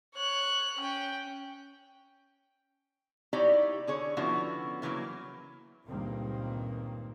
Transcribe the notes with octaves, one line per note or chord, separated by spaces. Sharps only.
C#5 F#6
C#4 G5
D#4 E4 F#4 G4 C#5 D5
D3 G#4 C#5
D3 F3 B3 C#4 E4 F#4
C#3 E3 F#3 A3 A#3
C#2 G2 A#2 D#3 A#3 C4